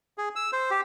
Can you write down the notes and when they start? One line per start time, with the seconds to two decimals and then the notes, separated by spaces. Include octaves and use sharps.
0.18 G#4
0.36 E6
0.53 C5
0.71 G4